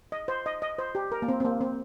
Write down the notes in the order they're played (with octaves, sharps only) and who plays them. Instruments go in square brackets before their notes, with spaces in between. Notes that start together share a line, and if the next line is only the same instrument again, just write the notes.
[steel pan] D#5
C5
D#5
D#5
C5
G4
A#4
A#3
C4
C4
A#3
C4